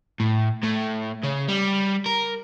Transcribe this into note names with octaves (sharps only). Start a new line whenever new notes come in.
A2
A2
C#3
G3
A#4